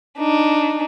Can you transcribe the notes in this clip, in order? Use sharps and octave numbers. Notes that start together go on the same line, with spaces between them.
D4 D#4